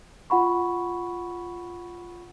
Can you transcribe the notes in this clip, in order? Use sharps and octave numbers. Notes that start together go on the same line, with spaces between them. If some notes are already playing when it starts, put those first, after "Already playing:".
F4 F#5 B5 C#6